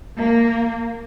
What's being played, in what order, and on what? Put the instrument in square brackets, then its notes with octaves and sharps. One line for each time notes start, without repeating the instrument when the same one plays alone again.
[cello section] A#3